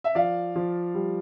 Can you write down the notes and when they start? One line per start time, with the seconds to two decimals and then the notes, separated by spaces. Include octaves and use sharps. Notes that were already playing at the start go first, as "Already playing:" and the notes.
0.04 E5
0.15 F3 D5 F5
0.55 F3
0.94 G3